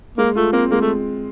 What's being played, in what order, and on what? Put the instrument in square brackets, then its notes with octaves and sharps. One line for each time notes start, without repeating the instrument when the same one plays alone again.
[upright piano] G#3 [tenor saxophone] A#3
[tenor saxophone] A3 [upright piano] F4
[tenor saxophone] A#3 [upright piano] C4
[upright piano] G#3 [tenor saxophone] A#3
[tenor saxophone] A3